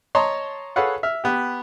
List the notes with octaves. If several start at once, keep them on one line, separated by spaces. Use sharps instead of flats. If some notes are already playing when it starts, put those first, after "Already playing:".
C#5 D#5 A5 A#5 C6
G#4 A4 B4 C#5 F5 F#5
E5 F6
B3 G4